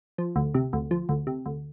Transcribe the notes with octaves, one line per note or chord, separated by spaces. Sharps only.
F3
D2
C3
D2
F3
D2
C3
D2